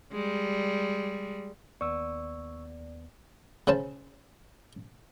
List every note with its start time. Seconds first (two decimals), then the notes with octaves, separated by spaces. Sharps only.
0.12 G3 G#3
1.81 D#2 B3 D5 C#6 E6
3.67 C#3 C#4 C5 A5